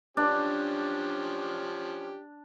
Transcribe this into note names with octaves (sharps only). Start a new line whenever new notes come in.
F3 C#4 D4 G4